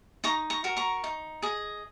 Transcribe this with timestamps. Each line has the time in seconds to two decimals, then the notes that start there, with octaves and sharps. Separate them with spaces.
0.24 D#4 A#5 C#6
0.50 A#5 C#6
0.64 F#4 A#4
0.77 A#5 C#6
1.04 D#4
1.42 G#4 D#5